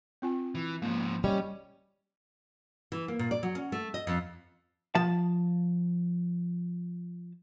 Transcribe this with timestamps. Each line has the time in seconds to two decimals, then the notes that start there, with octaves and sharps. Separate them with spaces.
0.22 C4 F4 G#5
0.55 E3
0.82 G#2 F3 A#3
1.24 G3 C#4 D#5
2.92 E3
3.08 A#3
3.19 A#2
3.31 D5
3.43 F#3
3.55 C#4
3.72 A3
3.94 D#5
4.07 F2
4.95 F3 A5